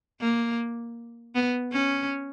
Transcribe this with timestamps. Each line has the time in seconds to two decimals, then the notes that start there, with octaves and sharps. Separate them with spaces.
0.20 A#3
1.35 B3
1.72 C#4